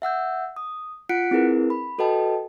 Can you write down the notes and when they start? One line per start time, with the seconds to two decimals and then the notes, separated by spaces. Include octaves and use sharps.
0.02 E5 F#5 E6 G6
0.56 D#6
1.09 F4 F#5 F#6 B6 C#7 D7
1.31 C4 E4 G#4 A#4 B4
1.70 B5
1.98 F#4 A4 B4 D#5 G5 A5